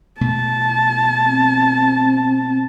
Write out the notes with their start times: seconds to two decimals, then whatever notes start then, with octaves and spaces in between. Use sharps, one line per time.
0.21 B2 A3 A5
1.24 C4